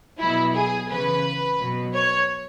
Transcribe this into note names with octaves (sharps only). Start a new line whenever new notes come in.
B2 F#3 E4
G#4
C#3 E3 B4
B2 F#3
C#5